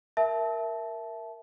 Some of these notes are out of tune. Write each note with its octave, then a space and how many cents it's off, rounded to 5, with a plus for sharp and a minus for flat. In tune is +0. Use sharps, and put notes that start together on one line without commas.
A#4 +0 E5 +0 A5 -20